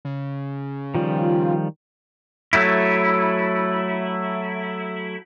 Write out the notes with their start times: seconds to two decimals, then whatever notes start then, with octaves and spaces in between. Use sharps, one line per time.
0.05 C#3
0.95 D#3 F3 G3 F4
2.53 F#3 A3 E4